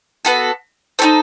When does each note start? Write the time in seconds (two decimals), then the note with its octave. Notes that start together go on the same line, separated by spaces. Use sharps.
0.25 B3 F#4 A4
0.99 D#4 F#4 A4 C5